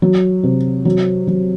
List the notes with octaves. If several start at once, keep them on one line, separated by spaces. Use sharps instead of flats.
F#3
C3
F#3
F#3